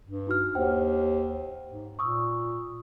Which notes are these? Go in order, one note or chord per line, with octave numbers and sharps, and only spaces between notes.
G2
D#4 F#4 F6
D#2 C5 F#5 G5
G#2
A#2 C#6 D#6 E6